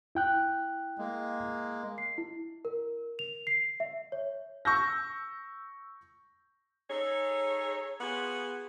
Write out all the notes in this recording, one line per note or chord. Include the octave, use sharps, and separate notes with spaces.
E4 G5 F#6
G#3 A#3
C7
E4
A#4
F7
C7
E5
C#5
C#6 E6 G6 A#6
D#4 G#4 A4 C#5
B3 F4 F#4 G#4 F#5